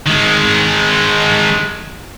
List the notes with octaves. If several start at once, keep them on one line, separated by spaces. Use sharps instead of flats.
D#3 G#3